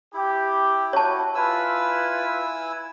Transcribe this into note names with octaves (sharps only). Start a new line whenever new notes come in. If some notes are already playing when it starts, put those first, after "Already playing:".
E4 G4
F#4 C#5 A5
E4 F4 B4 G#5 E6